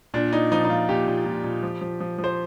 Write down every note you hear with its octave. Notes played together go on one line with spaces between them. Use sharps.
A#2 D4
A#2 D#4
F3 D#4
D#4
F3 F4
A#2 G4
A#2
A#2
A#2
F3
F3
F3
F3
C5